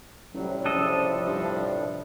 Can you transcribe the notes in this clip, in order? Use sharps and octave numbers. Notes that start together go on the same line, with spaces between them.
A1 A2 C3 F#3 G3
C#3 F3 D4 A4 D#5
G2